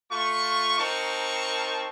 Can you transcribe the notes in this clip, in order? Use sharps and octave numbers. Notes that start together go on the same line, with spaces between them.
A3 F4 C#6
C4 D#4 A#4 A5 C#6